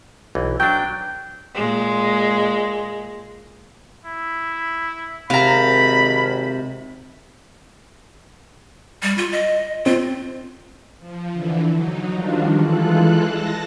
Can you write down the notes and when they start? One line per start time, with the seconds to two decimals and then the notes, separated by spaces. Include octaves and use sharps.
0.35 B1 E3
0.60 F#3 D4 G5
1.55 A#2 G#3
4.05 E4
5.30 G#1 C3 F5 A#5 B5
9.02 G3
9.18 F4
9.32 D#5
9.86 C4 F4
10.99 F3
11.33 D3 E3
11.73 F#3 D#4
12.12 D#3 F3 G3 D4 F4 F#4
12.55 E3 G#3 F4 A4 F#6
13.26 A5 A#6